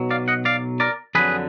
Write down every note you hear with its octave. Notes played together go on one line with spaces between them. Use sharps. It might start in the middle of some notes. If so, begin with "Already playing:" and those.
Already playing: B1 B2 F#3
D5 F5
D#5 F#5
D5 F5
A#4 D5
F2 D3 F#3 G#4 B4